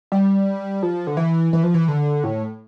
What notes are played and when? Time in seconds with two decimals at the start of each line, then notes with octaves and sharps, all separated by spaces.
0.12 G3
0.83 F3
1.07 D3
1.17 E3
1.53 E3
1.63 F3
1.74 E3
1.88 D3
2.24 A2